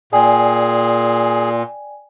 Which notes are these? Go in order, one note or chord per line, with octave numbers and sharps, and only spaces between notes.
A#2 G#4 D5 G5 G#5